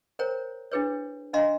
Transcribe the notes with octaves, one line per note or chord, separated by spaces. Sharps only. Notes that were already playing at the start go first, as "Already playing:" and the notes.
A#4 C5 C#5 G5 A#5
D4 E4 G#4 B4 C#5
D4 D#5 F5 A#5 C6